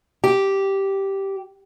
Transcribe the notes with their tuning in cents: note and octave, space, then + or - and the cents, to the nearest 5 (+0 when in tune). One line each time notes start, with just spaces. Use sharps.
G4 -5